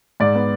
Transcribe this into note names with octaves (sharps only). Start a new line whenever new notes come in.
G#2 D5
B3